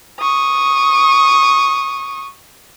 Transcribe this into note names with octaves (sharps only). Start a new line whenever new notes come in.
C#6 D#6